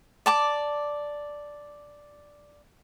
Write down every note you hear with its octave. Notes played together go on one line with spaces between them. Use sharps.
D5 A5 D6